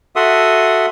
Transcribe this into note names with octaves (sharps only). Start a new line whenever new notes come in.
F#4 A4 E5 F#5 C6 D#6